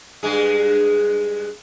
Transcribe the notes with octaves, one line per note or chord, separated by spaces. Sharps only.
G2 G#3 G#4